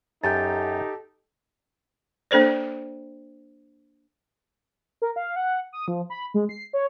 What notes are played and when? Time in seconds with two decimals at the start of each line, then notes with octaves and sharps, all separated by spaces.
0.24 F#2 D#4 G4 A4 G6 A6
2.31 A#3 D4 A4 C5 D5
5.02 A#4
5.16 F5
5.36 F#5
5.73 D#6
5.88 F3
6.10 B5
6.34 G#3
6.49 C7
6.73 C#5